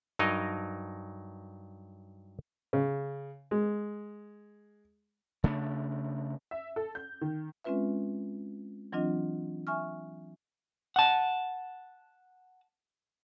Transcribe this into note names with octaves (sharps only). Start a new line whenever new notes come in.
G2 F#3 D#4 A#4 D#5
C#3
G#3
C#3 A3 D4
E5
A4
G6
D#3
G#3 C4 C#4 F4 B4 E5
E3 F#3 C4 D4 F4 D#5
E5 G#5 C#6 F6
F#5 A5